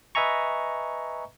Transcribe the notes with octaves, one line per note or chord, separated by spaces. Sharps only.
B4 D#5 E5 G#5 A#5 C#6